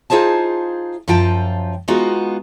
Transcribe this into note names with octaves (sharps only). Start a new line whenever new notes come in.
D#4 F4 G#4 C5 A5
F#2 F3 F4 G5 A5
G#3 B3 D#4 F4 F#4